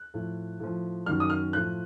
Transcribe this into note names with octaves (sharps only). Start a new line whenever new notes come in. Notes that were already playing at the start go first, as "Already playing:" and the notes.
Already playing: F#6
A2 F3
A2 F3
F#2 D#3 F#3 F6
D#6
F6
A2 F3 F#6